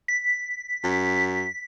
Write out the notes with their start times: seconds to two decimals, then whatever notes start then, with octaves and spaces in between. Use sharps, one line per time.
0.08 B6
0.84 F#2